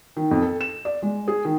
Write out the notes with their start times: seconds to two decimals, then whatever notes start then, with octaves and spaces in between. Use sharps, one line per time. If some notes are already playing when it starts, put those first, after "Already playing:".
0.16 D#3
0.31 F2
0.42 A4
0.61 E7
0.85 D5
1.02 G#3
1.28 G#4
1.45 D#3